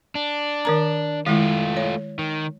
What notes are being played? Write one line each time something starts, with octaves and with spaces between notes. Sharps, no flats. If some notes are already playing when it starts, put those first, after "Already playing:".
D4
D#3 A#4 A#5
D#3 G#3 A3 E4 F4
C#5
D#3